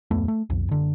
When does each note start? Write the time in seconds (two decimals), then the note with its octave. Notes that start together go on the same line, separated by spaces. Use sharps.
0.11 D1 F2 A3 B3
0.28 A3
0.50 B1 F2
0.68 F#1 D3